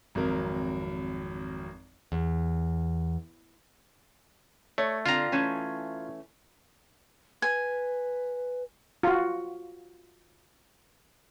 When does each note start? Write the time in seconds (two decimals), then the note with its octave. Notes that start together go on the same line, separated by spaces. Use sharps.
0.15 G#1 F2 F#3 A#4
2.12 E2
4.78 A3 C#5
5.06 D3 C4 F4 F5 A#5
5.32 E3 A3 C#4
7.42 B4 G#5
9.03 F4 F#4